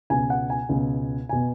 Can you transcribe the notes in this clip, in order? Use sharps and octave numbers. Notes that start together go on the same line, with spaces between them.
C#2 B2 G#5
F#5
G#5
C#2 B2
B2 G#5